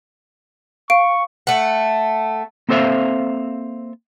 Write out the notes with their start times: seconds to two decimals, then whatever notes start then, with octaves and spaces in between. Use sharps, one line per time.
0.90 F5 C#6 D7
1.47 A3 F#5
2.69 A#3 C4 A4 C5 E5 F5